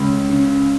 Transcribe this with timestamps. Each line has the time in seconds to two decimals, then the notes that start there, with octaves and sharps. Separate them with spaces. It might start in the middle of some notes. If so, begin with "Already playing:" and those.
Already playing: C#2 C#3
0.29 C#3